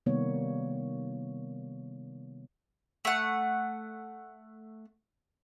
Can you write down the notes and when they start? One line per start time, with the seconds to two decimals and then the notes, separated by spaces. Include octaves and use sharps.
0.06 C3 D#3 G3 A#3 B3 C#5
3.05 A3 F#5